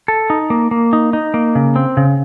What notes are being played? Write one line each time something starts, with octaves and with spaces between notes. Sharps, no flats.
A4
D#4
A#3
A#3
D#4
D#4
A#3
C#3
C4
C#3